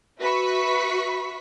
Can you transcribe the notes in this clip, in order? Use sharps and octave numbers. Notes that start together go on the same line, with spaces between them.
F#4 B4 E5 B5 C#6 B6